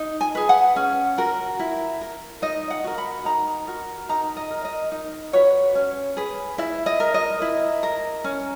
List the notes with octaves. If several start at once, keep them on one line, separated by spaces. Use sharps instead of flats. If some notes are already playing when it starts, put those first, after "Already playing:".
Already playing: D#4
G#5
G#4 B4
F#5
C#4
F#4 A#4
E4
A#4
D#4 D#5
F#5
F#4 A#4
B5
D#4 A#5
F#4 A#4
D#4 A#5
D#5
A#4
D#5
D#4
F#4 B4 C#5
C#4
G#4 B4
E4 E5
D#5
A#4
D#5
E4
A#4
C#4